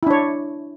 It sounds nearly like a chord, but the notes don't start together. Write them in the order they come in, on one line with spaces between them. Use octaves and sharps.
E4 D4 C#5